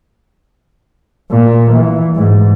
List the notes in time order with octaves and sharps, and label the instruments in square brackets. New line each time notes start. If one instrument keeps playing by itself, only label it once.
[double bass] A#2
E3
G#2